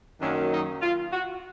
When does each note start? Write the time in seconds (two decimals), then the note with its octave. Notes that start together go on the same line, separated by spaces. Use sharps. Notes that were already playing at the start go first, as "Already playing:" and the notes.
0.20 F#2 D#3 F#3 A#3 D4
0.51 D#4
0.82 F4
1.13 F#4